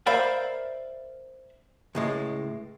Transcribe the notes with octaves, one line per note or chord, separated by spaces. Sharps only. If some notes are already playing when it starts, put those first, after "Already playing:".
A#4 C5 D5 E5 F5 B5
C#2 A2 G#3